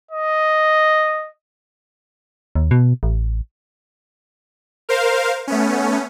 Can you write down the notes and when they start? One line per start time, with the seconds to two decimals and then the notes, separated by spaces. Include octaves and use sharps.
0.11 D#5
2.55 D#2
2.71 B2
3.03 A1
4.89 A#4 C5 F5
5.47 A3 B3 C#4